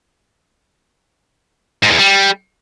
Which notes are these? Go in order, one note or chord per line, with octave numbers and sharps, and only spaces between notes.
G#2
E2
G3